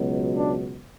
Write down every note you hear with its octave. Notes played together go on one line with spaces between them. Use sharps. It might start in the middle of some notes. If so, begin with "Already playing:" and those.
Already playing: C#2 B2 F#3
D4